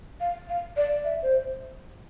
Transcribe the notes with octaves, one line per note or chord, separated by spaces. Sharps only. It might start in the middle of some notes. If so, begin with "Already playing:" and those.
F5
F5
D5
E5
C5